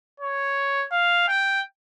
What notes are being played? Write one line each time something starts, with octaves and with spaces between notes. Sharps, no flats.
C#5
F5
G5